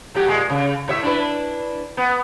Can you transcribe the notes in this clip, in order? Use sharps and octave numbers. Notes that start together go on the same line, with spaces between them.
F#3 A3 G4
A#2 G#3
C#3
A2 C#5 E5
D4 E4 B4
B3